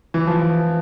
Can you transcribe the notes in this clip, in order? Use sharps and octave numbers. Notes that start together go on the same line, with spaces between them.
E3
F3